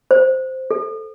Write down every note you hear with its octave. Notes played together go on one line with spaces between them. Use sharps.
C5
A4